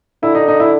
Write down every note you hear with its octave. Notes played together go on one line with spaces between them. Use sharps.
D3 E4
D#4
D#4
E4